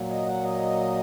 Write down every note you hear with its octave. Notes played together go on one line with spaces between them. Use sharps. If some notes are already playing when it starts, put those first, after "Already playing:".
Already playing: A#2 F#3
D#5
F#5
D#5